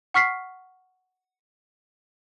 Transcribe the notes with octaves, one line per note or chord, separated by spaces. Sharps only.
F#5 C#6 F6 B6 C7